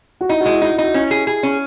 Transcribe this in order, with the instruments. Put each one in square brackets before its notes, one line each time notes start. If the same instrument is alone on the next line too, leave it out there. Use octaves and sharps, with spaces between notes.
[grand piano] F#4
[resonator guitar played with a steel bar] D#4 [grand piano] E4
[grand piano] F#4
[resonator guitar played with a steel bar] G#3
[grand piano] E4
[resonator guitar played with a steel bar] D#4 [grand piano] F#4
[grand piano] F#4
[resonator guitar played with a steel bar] D#4
[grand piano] F#4
[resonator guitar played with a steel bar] C#4 [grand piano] E4
[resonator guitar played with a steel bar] G#4
G#4
C#4